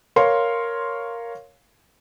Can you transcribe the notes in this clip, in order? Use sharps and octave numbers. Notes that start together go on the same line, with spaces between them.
A#4 C#5 F5 C6